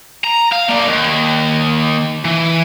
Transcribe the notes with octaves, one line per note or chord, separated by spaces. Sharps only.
A#5
F5
A#3 D4
D#2
E3